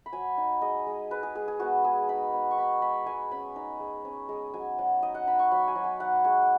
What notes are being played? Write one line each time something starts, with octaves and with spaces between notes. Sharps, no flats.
B5
F#3 G#5
D#4
G#3 D#5
G#3
G#3 B4
G#4
G#3 G#4
G#4
B3 F#4
G#3 G#4
D#4 B5
B3
C#6
D#4 B5
G#3 B5
G#3 G#5
C#4 B5
D#4
G#3
C#4
G#3
F#3 G#5
F#3 F#5
D#4 D#5
F#5
D#4 B5
C#6
F#3 B5
G#5
F#3
G#5
D#4 F#5
G#3 C#5